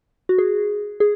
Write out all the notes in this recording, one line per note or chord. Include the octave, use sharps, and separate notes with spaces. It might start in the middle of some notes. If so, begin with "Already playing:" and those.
F#4
G#4
G#4